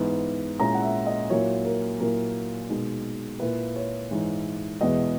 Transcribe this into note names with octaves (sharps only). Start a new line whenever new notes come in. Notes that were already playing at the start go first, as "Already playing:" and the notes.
Already playing: G#2 E3 B3
A#2 G#3 C#4 E4 A#5
F#5
E5
D#5
A#2 F#3 A#3 E4 C#5
A#4
A#2 F#3 A#3 E4 A#4
B2 G#3 D#4
A#2 A#3 E4 B4
C#5
G#2 E3 G#3
E2 B2 G#3 B3 E4 D#5